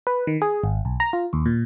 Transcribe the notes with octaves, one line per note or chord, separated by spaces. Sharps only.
B4
D#3
G#4
G#1
B1
A#5
F4
D#2
A#2